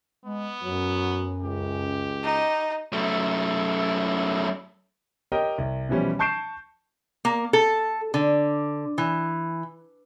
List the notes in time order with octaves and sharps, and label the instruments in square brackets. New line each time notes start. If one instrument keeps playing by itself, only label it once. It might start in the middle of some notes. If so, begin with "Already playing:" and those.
[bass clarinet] G#3 [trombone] B3
[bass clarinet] F#2 [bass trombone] F#3
[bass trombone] C#2 [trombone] G4
[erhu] D#4
[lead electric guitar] F#2 A3
[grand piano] G4 A#4 C#5 D#5 G5
C2
B2 E3 F3 G3 C#4
A5 C#6 G6 C7 D7 E7
[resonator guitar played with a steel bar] A#3
A4
D3
E3